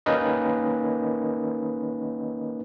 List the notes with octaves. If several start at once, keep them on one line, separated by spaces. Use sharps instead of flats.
D#3 A#3 C#4 D#4 B4 D#5